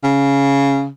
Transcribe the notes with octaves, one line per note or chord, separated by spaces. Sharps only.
C#3